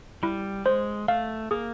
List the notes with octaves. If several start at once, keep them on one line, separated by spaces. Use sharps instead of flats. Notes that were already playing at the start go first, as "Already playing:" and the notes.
G3 E4
G#3 C5
A3 F5
A#3 G#4